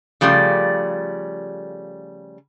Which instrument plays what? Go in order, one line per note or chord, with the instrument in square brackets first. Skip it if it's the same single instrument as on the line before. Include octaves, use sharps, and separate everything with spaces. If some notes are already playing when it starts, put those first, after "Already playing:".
[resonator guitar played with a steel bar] C#3 F3 G3 A3 D5